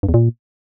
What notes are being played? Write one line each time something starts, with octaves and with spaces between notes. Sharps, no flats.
G2
E2
A#2